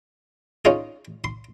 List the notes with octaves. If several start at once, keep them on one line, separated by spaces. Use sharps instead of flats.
C#4 D#4 F4 G#4
C6